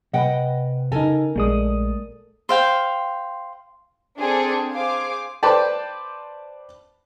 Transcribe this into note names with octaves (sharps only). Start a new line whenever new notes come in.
C3 B4 D#5 F#5 G5 B5
C#3 D#4 A4 A#4 G#5
A#1 G#3 A3 D5 D#6
C5 F5 G5
C4 D4 G#4 A4
G#4 C5 F5 D6
B4 C5 D5 G5 A5